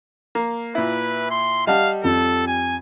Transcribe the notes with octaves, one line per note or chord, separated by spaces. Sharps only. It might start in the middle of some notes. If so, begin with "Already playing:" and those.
A#3
A#2 E4 B4
C6
G3 D#5 F5 F#5 A5
F2 A4
G#5